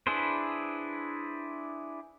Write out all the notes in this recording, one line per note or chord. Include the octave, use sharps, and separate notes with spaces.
D4 E4 G#4 B4 C5